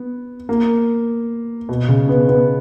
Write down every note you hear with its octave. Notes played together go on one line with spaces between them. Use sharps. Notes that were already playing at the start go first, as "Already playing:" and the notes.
Already playing: B3
A#3
B2
C#3
B3
B3